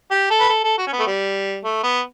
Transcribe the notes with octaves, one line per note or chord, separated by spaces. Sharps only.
G4
A4
B4
A4
A4
F#4
C#4
B3
A3
G3
A3
B3